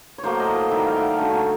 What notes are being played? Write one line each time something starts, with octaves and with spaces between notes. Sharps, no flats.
C#5
A2 F#3 A#3 C5
D#5
D#5
D#3 G3 A#3 E5
F5
G5
F#5
A5
D3 F#3 A3 G#5
G#5
A5